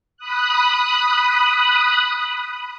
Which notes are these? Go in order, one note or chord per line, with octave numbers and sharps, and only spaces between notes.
B5 D#6 F#6